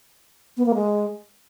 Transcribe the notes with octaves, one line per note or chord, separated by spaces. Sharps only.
B3
A#3
G#3